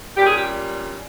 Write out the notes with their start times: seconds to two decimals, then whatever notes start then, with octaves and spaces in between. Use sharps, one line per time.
0.16 A#2 G3 C#4 G4
0.27 G#4
0.36 G4